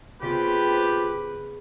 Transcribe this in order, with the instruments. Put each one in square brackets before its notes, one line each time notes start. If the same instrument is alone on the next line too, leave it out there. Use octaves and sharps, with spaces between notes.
[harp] C#3 B3 [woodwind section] C4 F4 G4 [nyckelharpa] B4